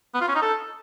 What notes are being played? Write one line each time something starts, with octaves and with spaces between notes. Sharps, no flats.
B3
F4
C#4
D#4
A4